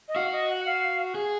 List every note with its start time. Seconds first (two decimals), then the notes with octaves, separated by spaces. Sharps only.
0.08 D#5
0.16 F#4 F5
0.32 D#5
0.49 F#5
0.66 F5
1.15 G#4